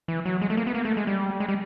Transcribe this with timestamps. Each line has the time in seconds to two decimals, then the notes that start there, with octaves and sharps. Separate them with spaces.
0.08 E3
0.25 F#3
0.42 G#3
0.50 A3
0.57 A#3
0.67 B3
0.74 A#3
0.85 A3
0.97 G#3
1.07 G3
1.40 G#3
1.48 G3